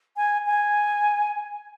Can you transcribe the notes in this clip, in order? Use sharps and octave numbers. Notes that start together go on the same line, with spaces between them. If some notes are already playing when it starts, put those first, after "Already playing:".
G#5
G#5